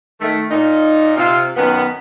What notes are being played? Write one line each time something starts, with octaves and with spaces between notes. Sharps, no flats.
D#3 A3
A#2 D#4
C3 F4
F#2 D#3 B3